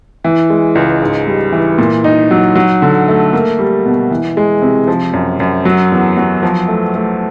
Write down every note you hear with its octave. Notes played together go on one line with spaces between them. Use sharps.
E3
G#3
C#2
G#2
G3
E3
A#2
D#4
F#3
F#3
D3
A3
A#3
G3
B2
E3
G#3
C3
F3
F#2
F#2
F#3
E2
F#3
F3
A3
A3